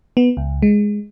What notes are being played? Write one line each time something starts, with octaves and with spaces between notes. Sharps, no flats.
B3
C#2
G#3